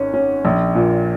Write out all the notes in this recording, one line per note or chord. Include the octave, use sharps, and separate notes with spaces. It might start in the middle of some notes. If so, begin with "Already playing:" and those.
Already playing: G#1 C#4
C#4
A#1
A#2